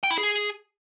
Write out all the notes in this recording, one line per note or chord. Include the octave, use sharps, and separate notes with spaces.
G5
E4
G#4